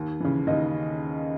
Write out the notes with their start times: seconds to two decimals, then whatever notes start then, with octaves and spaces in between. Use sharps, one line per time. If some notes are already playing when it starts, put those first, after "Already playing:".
Already playing: D#2
0.21 C#3 E3
0.47 D#2 D#5